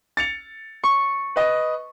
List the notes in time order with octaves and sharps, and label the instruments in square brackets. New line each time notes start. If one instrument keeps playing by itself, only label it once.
[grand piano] A6 C#7 F7
[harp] C#6
[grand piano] B4 D#5